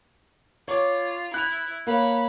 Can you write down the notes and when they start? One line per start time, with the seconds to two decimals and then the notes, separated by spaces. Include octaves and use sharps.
0.68 F4 C#5 D6
1.34 E4 F#6 F7
1.87 A#3 C#5 B5